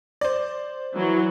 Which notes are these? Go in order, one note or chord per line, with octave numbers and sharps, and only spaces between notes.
C5 D5
E3 F#3